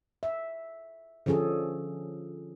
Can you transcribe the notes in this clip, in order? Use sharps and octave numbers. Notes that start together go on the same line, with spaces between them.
E5
D3 F3 C#4 G#4 A4